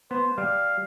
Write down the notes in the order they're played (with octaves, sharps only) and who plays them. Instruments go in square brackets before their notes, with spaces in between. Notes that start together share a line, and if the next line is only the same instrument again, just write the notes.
[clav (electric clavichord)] B3 [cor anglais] C5
[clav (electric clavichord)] G3 [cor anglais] F5